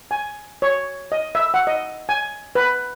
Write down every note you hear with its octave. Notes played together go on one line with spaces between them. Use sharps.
G#5
C#5
D#5
E5
F#5
D#5
G#5
B4